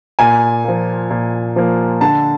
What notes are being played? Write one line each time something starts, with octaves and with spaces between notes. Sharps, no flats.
A#2 G#5
F3 A#3
A#2
F3 A#3
D3 A5